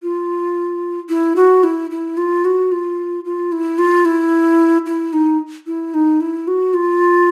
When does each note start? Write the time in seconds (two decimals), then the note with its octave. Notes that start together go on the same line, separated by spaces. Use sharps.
0.03 F4
1.09 E4
1.36 F#4
1.63 E4
1.91 E4
2.17 F4
2.45 F#4
2.72 F4
3.25 F4
3.52 E4
3.78 F4
4.05 E4
4.86 E4
5.13 D#4
5.67 E4
5.94 D#4
6.20 E4
6.47 F#4
6.74 F4